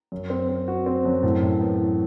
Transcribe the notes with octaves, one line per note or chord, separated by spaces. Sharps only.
F#2
C4
C4
F#4
C4
F#2
A2
A2
B3
E3